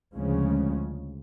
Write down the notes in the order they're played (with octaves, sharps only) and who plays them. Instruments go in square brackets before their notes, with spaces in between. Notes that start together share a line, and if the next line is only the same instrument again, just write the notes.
[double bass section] D2 C#3 F3 G#3 C#4